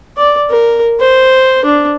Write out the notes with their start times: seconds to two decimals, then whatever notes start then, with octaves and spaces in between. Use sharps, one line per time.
0.17 D5
0.50 A#4
1.00 C5
1.65 D4